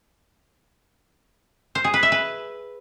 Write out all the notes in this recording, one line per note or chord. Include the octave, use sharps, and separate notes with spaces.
C5
G#4
B4
E5
B4